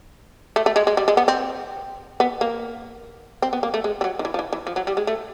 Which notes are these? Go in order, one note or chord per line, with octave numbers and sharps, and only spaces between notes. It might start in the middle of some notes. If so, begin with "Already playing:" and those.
A3
A3
G#3
G#3
G3
G#3
B3
C4
B3
A#3
C4
B3
A#3
A3
G#3
G3
F#3
D#3
E3
F3
E3
E3
F3
F#3
G3
G#3
A3